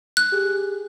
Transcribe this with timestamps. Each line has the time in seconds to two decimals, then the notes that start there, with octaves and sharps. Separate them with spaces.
0.17 F#6
0.32 G4 G#4